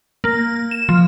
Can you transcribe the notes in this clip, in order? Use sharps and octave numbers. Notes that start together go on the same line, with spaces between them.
A#3
E7
F3